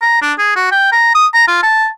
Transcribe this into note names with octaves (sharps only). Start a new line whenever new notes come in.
A#5
D4
G#4
F#4
G5
A#5
D#6
A#5
F4
A5